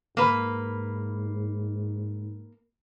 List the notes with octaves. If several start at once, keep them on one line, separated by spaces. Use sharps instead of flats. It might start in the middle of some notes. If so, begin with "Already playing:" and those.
G#2 A#3 B4